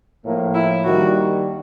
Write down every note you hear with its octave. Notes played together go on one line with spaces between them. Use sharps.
A2 F3 A#3
E4
D#3 G3 A#3 D4 F#4